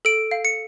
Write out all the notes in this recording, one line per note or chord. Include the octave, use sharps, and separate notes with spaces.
A4 D7
F5
C#7